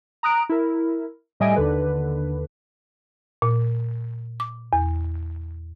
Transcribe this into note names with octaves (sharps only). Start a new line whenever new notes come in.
A#5 D#6 F#6 D7
E4 A#4
A2 G3 D#5 E5 G#5 D7
D#2 D3 B4
A#2
D6
E2